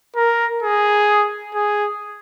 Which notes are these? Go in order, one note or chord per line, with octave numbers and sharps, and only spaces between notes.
A#4
G#4
G#4